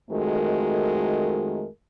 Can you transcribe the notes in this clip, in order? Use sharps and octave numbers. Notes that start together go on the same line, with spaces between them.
F2 D#3 G#3 A3 F#4 A#4